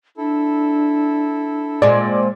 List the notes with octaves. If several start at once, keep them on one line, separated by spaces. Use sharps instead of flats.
D4 E4 A4
A#2 G#3 C4 D5